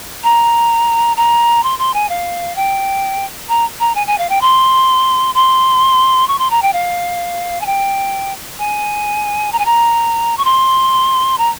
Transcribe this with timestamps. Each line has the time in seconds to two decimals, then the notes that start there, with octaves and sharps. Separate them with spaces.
0.23 A#5
1.17 A#5
1.63 C6
1.79 C6
1.94 G#5
2.09 F5
2.56 G5
3.48 A#5
3.80 A#5
3.95 G#5
4.07 G#5
4.18 F5
4.29 G5
4.41 C6
5.34 C6
6.28 C#6
6.39 C6
6.50 A#5
6.62 G5
6.73 F5
7.61 G#5
7.66 G5
8.59 G#5
9.52 A#5
9.59 G#5
9.65 A#5
10.37 C#6
10.45 C6
11.38 A#5